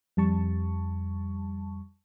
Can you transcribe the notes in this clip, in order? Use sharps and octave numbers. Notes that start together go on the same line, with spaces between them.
F2 G3 A5 C#6